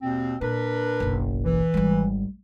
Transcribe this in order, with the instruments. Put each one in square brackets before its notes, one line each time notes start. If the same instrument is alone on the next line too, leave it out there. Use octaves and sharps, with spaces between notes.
[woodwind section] D#2 B2 C4
[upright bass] A#2 [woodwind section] D4 A#4 B4
[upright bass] F#1 B1
[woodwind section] E3
[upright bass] G#1 G3